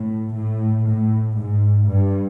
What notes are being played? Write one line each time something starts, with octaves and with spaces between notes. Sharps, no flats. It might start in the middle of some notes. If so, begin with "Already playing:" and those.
Already playing: A2
A2
A2
G#2
G2